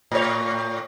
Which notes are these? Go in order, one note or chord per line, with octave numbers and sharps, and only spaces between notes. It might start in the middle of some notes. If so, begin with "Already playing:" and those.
A2 C#5